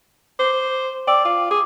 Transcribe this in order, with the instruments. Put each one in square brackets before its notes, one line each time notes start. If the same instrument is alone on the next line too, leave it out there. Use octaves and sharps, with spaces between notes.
[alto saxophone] C5 [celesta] D6
[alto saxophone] D5 [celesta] G5 D6 E6
[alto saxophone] F4 [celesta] D6
[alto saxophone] G#4 [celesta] D6 D#6